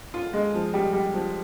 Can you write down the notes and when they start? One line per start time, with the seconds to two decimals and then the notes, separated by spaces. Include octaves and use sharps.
0.14 F4
0.33 G#3
0.54 F3
0.74 G3
0.93 G3
1.14 F3